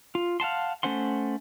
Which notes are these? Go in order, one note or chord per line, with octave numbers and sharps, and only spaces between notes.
F4
F5 F#5 A5 C6
A3 C#4 C5 F#5 C6